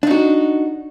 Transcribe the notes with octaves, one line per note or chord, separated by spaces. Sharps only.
D4 D#4 F#4